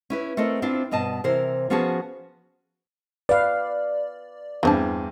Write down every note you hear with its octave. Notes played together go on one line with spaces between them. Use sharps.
C#4 E4 B4
A3 C4 A4 A#4 D#5
C4 D4 E4 F4 C5
G2 B2 D#5 A5
C3 E3 A#4 C5
F3 B3 C#4 F#4 G#4 A5
B4 D5 F5
E2 G2 E3 C4 A5